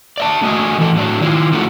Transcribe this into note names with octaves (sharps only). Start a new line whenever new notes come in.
D5 E5 A5
D3 A3 F#4 D#5 G#5
E3 A4
A2 F#3 D4
D#3 E4 F4
C#3 F3 A3 F#4